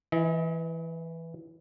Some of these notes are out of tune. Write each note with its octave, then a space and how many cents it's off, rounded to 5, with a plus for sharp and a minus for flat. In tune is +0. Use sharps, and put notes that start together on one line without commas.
E3 +0 D#5 +45